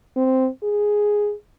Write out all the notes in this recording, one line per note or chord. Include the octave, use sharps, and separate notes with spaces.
C4
G#4